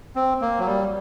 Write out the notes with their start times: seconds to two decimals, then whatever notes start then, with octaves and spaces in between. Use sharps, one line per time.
0.16 C4
0.42 A#3
0.59 F#3
0.67 G3